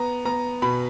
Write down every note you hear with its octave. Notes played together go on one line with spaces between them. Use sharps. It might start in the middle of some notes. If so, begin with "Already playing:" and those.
Already playing: B3 A#5
B3 A#5
B2 B5